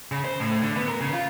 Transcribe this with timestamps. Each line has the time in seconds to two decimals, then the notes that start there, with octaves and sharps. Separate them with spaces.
0.11 C#3
0.25 C5
0.40 A2
0.62 D3
0.76 B3
0.88 A#4
1.01 C#3
1.13 F4